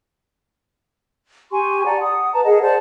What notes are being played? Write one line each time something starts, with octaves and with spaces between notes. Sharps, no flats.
G4 G#5 C6 C#6
D5 F#5 A5 A#5
F#5 D#6
B4 A5 A#5
G#4 A#4 D#5 F#5
C5 D5 F#5 A5